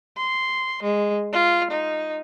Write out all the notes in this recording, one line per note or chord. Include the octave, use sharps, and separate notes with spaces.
C6
G#3
F4
D#4